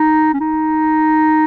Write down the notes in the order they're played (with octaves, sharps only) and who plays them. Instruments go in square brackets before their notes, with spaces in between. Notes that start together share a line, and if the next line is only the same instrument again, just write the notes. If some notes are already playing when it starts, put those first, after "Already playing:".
Already playing: [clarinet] D#4
C#4
D#4